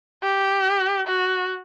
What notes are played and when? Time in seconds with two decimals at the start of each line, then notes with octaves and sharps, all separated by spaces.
0.23 G4
1.07 F#4